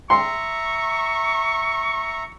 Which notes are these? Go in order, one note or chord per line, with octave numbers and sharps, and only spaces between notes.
E5 A#5 C6 C#6